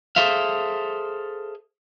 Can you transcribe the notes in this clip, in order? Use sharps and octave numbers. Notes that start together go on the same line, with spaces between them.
G#4 A4 C5 E5 F5